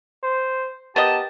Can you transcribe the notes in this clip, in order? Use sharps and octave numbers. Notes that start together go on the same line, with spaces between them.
C5
B3 G4 A#4 D#5 A5